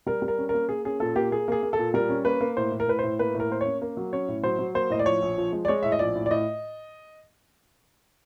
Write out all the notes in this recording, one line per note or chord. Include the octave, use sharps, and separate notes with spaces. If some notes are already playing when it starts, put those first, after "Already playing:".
G3 A#4
G3
A#4
C#4
A#3 A#4
A#3 G#4
C#4 G#4
A#2 A4
A#3 G4
A#3 G#4
A#3 G#4
A#3
A4
A#2
G3 A#4
C#4
A#3 B4
A#3
A2 C5
A2
A#4
A2 B4
A2 C5
A#3 B4
A2
A#4
A#3 C5
C#5
C#4
A#3
F#3
C#4 C#5
A2
F#3 C5
F#3
A#3 C5
A2 D#5
D5
F3 C#5
A#1
F3
G#3
D5
G#3 C#5
A2 E5
D#5
A#1 D5
A2
D5
A2 D#5